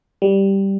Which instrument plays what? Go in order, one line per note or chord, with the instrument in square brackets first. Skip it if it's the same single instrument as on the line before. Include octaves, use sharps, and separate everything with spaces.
[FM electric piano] G3